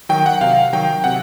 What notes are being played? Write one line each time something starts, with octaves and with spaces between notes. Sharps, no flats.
D#3 F#3 G5
F#5
C3 F5
D#3 F#3 G5
C3 F#5